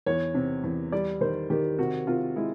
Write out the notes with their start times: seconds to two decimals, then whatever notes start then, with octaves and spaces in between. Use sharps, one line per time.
0.06 E2 C#5
0.34 C3
0.64 E2
0.92 G3 D5
1.21 D#3 C5
1.50 D#3 G4
1.79 C3 F#4
2.07 C3 F4
2.36 G#3 E4